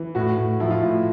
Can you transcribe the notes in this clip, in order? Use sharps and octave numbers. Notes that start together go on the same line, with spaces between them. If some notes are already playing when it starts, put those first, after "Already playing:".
Already playing: E3
A2 F#4
A2
F3 E4
F4
A2 E4